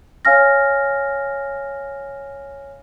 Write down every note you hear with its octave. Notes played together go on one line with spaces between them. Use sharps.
C#5 F5 G#5 F6 A#6